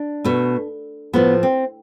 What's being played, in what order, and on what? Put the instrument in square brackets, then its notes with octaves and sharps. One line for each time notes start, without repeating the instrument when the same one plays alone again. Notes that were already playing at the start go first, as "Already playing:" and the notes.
Already playing: [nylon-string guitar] D4
B2 A3
A2 F3 A3 B3
C4